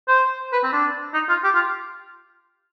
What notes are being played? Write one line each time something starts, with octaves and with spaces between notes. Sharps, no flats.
C5
B4
C4
D4
D#4
F4
G4
F4